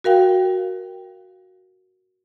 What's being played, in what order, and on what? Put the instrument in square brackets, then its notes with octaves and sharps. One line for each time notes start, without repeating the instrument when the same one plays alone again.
[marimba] F#4 A#4 F5 G5